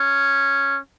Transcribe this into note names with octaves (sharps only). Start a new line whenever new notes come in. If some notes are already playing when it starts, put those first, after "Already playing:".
Already playing: C#4